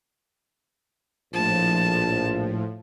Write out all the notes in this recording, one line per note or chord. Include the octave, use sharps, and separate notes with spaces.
A#1 A2 F3 A5